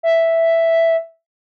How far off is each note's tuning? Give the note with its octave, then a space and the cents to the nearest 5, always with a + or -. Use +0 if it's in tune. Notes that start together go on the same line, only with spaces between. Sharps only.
E5 +0